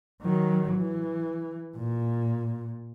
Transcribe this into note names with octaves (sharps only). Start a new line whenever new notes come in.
D#3 F#3
E3
A#2